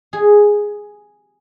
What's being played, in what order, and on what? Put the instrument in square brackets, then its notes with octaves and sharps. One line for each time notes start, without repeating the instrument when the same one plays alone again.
[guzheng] G#4